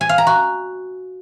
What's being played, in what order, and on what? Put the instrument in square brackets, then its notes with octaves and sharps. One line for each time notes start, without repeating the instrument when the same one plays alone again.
[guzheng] G#5
F5
A#5
F#4